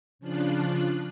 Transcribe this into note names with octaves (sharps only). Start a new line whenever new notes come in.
C#3 F3 D4 F4 F#6